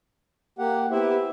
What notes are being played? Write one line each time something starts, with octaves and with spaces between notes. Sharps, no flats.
A#3 G4 F#5
B3 E4 G4 C5 E5